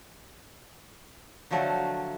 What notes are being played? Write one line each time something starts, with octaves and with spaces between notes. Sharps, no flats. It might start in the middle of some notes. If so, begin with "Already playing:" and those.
D3 F3 F#3 A3